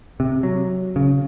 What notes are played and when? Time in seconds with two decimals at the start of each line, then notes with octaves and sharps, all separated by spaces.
0.20 C3
0.43 F#3
0.96 C#3